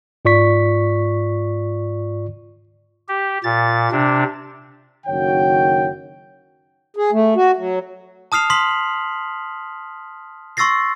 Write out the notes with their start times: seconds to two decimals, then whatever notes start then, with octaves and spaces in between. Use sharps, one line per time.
0.25 G#2 F4 D5 C#6 B6
3.08 G4
3.44 A#2 A6
3.92 C3 D4
5.07 F#1 D#3 F#4 C#5 G5
6.96 G#4
7.12 A3
7.36 F#4
7.56 F#3
8.32 A5 D#6 F6 C7 F7
8.50 C6 D#6 B6 F#7
10.57 C6 C#6 E6 A6 A#6 C7